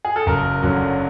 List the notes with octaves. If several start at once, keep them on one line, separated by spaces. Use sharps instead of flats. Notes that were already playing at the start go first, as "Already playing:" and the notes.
G#4
A4
F#1 A#4
F#2 D3